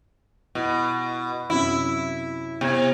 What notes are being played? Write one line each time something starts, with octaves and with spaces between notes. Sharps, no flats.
B2 E4
F#2 C3 E4
C3 B3 G#6